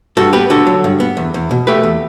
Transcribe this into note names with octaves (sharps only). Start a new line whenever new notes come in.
G2 F#4 A4
B3 G4 B4
D3 F#4 A4
F#3
G2
B3
E2
E2
B2
A3 G4 B4
E2